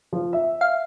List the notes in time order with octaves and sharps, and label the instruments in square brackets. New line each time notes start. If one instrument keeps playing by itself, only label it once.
[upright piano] F3
E5
[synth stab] F5